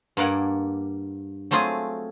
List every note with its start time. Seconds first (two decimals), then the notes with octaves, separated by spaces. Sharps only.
0.17 G2 A#3 D5 F#5 G#5
1.51 F#3 A3 C4 F4 G#4